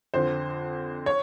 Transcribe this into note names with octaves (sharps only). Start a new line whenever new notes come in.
F2 D3 C5
C#5